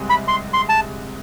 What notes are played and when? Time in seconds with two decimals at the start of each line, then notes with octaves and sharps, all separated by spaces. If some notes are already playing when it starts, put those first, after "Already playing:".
Already playing: C2 C3 G#3
0.10 B5
0.28 C6
0.53 C6
0.69 A5